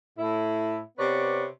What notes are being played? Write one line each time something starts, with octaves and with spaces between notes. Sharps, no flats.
A2 E4
C3 B3 B4 C#5 D5